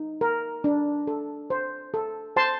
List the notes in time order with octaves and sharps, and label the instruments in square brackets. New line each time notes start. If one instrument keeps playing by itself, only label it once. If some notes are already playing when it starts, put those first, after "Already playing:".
Already playing: [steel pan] D#4
A#4
D4
A4
C5
A4
C5 A5 C6